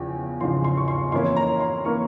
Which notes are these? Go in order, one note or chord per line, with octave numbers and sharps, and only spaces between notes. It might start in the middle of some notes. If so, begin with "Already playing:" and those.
Already playing: E2 C#3 F3 G5
E2 C#3 F3 C6
C6
C#6
C6
F2 E3 A#3 C#4 E4 C6
A#5
C6
E3 A#3 C#4 E4 C#6